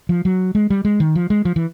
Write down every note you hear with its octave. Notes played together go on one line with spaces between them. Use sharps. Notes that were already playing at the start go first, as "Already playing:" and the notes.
F3
F#3
G#3
G3
G#3
D#3
F3
G#3
F3
E3